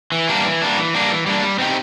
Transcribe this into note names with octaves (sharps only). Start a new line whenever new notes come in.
E3
G3 A#3 D4
E3
G3 A#3 D4
E3
G3 A#3 D4
E3
G3 A#3 D4
G3
C4 D#4 G4